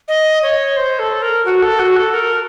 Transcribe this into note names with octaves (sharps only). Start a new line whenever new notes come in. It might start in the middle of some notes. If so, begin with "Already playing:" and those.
D#5
C#5
C5
A4
A#4
F#4
A4
F#4
A4
A#4